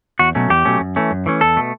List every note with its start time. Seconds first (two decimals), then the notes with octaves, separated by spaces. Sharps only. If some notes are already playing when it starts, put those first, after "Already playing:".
0.19 E2 F#4
0.35 B2 F#3 A3 C#4
0.50 E2 G4
0.65 B2 F#3 A3 C#4
0.80 F#2
0.96 E3 A3 C#4
1.11 F#2
1.26 E3 A3 C#4
1.41 E2 A4
1.56 B2 A3